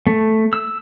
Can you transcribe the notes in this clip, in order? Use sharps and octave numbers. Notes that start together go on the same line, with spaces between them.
A3
E6